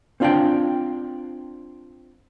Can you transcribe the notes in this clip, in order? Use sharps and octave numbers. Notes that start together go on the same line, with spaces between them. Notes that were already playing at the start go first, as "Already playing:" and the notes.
C4 D4 F4 D5 F5 G5